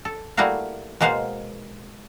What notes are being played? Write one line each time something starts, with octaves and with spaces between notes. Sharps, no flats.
A4
G3 A3 A#3 E4 F#4 F5
B2 G#3 A#3 C5 F5 F#5